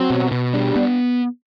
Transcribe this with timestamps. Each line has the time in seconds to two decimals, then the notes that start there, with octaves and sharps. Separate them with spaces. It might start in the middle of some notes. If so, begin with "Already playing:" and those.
Already playing: F#3 C4
0.10 B2
0.32 B2
0.54 G3 D4
0.76 B3